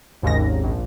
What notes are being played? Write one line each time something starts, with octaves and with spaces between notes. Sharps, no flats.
G#1 D#2 G#2 C#3 A#6
G#1 D#2
A#1